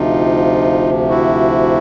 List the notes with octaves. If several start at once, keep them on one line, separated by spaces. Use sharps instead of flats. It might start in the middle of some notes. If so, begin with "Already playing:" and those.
Already playing: D2 C3 F3 D#4 F4
E4 F#4